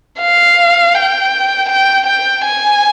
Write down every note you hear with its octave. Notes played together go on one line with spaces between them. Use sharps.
F5
G5
G5
G5
G#5